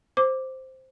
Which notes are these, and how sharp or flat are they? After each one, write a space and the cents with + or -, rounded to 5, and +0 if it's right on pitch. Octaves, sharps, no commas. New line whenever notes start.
C5 +0 D6 +0